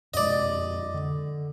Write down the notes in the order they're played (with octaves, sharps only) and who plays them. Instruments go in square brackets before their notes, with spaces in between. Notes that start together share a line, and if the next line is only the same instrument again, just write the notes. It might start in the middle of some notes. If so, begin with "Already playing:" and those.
[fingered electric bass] F2 G#3 [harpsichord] D5 D#5
[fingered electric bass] D3